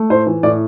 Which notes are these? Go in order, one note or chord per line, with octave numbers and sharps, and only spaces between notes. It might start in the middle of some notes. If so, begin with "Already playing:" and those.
Already playing: A3
A2 C5
E3
A2 D5